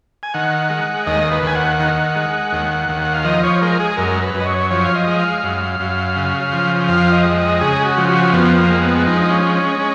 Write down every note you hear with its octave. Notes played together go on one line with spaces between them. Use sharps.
G#5
D#3 F#5
G#3
D#2 D#5
B4
D#2 G#5
F#5
D#3
G#3
D#2
D#2
F#5
F5
F3 D#5
C#5
G#3 A#4
G#4
F#2 A#4
B4
F#2
D#5
C#5
F3 C#5
F5
D#5
G#3
F5
F#2
F#2
C#3
F3
F2 F5
D#5
G#3
D#5
C#3 G#4
F#4
F3
F#4
F2 B3
A#3
G#3
B3
F3 D#4
D#4
C#4
G#3
C#4
C#4